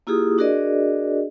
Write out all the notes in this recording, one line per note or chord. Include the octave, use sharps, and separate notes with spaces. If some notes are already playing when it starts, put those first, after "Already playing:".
A#3 E4 F4 G4 G#4 D#6
D4 F#4 G#4 A#4 D5 D#5